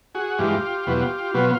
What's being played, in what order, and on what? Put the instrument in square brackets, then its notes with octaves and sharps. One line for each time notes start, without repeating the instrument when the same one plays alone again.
[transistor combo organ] F#4 G#4
G2 E3 G#3 F4 G4
E2 B2 F#3 B3
B2 F#3 B3 F4